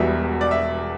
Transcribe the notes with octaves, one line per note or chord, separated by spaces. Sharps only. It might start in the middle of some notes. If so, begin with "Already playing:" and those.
Already playing: E1 E2 B2 G3 E5
D5
E5